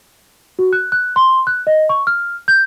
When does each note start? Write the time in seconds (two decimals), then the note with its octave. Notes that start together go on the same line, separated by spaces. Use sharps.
0.59 F#4
0.73 F#6
0.92 F#6
1.16 C6
1.47 F#6
1.67 D#5
1.89 C#6
2.07 F6
2.48 G6